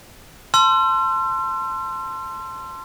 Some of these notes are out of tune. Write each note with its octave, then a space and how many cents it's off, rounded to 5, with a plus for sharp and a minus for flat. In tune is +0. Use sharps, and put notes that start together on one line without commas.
A5 +0 C6 +0 E6 +45